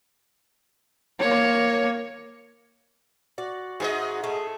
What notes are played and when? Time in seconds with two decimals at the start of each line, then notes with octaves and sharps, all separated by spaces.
1.20 A#3 C#5
3.38 F#4 D5
3.80 G#2 G#4 A#4 D#5 E5
4.24 A3 G#4